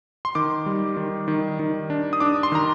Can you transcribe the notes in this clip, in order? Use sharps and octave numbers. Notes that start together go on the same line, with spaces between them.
C6
D#3 D6
G3
D#3
D#3
D#3
D4
D#6
D4 D6
C6
D#3 A#5